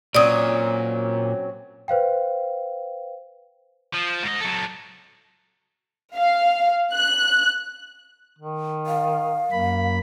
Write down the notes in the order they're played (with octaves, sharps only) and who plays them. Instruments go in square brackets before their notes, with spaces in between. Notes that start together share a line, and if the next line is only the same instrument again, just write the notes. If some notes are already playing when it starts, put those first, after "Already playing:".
[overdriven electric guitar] A#2 [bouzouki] F#3 C4 C#4 [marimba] D5 D#6
[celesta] B4 C5 F5 G5
[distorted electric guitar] F3
G#2 D#5
F#3 A4
[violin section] F5
F#6
[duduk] D#3
[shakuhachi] F5
[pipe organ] F#2 A#3 B5